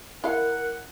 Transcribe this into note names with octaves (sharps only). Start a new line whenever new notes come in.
E4 A#4 F5 F#5